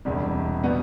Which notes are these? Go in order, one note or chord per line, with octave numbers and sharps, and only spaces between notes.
E1 E2 C3 G3
B2 G3 B3